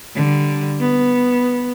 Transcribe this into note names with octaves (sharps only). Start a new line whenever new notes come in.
D3 G3
B3